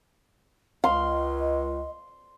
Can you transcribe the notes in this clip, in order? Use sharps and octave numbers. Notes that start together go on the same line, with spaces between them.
C#2 D#5 F5 C6